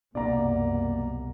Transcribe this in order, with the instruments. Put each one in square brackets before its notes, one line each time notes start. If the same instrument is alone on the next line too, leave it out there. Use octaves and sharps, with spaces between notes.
[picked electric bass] C2 B2 [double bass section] F#2 [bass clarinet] A#3 [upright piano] D5 A#5